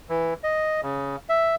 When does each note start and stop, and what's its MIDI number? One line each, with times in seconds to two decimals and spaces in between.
0.09 0.34 52
0.43 0.81 75
0.83 1.16 49
1.29 1.55 76